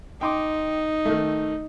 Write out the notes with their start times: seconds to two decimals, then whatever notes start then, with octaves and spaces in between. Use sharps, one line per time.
0.21 D#4 G5 C6 D6
1.05 D#3 A3